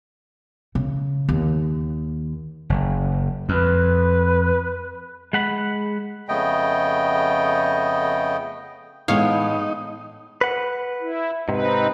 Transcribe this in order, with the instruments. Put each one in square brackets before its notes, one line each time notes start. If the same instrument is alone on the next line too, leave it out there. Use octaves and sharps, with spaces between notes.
[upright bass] C#3
D#2
[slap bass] F#1
[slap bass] F2 [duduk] B4
[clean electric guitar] G#3 F#5 B5
[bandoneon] F2 C#3 A3 B3 D#5 G5
[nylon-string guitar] A2 E3 G#3 [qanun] B3 C#5 [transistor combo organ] D#4 [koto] F5
[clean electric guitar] B4 F#5
[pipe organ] E4
[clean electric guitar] G#2 C3 [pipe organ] C4 D#4 B4